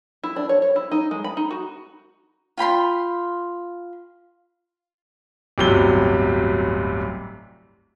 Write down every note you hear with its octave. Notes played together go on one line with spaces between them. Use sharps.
E4
D4
C#5
C#5
E4
D#4
G#3
B5
D#4
F#4
F4 G5 B5 C6
D1 G1 C3 F#3 G7